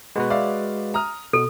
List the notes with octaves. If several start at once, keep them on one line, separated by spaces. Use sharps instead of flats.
B2 G#3 B3 F#4 B4
D5 E5 F5
A#5 D#6 F6
B2 A4 D#6